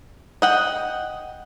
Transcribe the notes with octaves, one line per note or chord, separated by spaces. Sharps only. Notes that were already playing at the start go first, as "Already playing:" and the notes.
D#5 F#5 G5